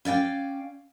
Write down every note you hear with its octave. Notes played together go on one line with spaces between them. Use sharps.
C#4 D5 F5 G5